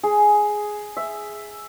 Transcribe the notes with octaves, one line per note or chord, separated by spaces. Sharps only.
G#4
E5